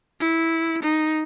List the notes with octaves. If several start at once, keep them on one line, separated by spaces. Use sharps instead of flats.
E4
D#4